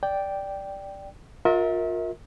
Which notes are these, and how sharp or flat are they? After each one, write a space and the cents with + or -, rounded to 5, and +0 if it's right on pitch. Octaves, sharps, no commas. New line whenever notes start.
D5 +0 G5 +0
F4 +35 A#4 +0 E5 -40